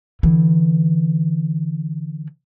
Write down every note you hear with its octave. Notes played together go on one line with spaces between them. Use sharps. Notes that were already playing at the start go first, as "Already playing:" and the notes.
D3 E3